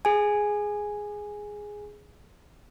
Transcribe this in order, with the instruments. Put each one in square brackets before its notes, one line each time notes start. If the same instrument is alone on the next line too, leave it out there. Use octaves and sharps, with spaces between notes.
[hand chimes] G#4 G#5